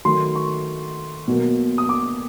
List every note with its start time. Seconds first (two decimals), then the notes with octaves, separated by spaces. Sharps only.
0.05 D#3 F#3 A3 C6
0.36 C#6
1.28 B2 F#3 A#3
1.78 D#6
1.89 D6